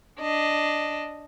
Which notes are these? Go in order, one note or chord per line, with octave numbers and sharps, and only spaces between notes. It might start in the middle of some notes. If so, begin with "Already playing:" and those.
D4 D#5